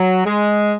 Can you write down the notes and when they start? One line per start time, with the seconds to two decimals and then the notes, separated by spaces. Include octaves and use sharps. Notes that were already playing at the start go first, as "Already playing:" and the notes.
Already playing: F#3
0.26 G#3